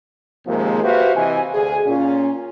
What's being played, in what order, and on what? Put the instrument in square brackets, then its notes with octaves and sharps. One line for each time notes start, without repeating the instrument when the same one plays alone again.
[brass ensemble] D#2 C3 F3 G#3 A#3
F#4 G4 B4 C5 E5 F5
C3 E3 D#5 G#5
D2 G#4 G#5
A#2 C#4 F4